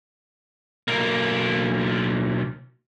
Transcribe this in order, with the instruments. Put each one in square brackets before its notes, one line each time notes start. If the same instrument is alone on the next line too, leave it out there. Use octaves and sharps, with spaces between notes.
[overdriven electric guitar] B1 A#3